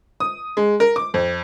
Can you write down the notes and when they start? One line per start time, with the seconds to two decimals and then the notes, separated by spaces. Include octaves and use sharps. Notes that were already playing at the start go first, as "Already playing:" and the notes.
0.20 D#6
0.57 G#3
0.80 A#4
0.96 D6
1.14 F2